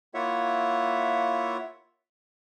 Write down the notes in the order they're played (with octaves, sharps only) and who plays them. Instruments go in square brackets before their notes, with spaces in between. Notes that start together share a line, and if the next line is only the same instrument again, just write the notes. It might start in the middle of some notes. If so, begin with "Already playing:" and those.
[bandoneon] A#3 E4 F4 C#5 E5 F#5